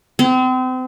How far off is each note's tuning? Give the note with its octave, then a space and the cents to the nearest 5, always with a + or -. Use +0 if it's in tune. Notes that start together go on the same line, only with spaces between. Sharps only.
C4 -35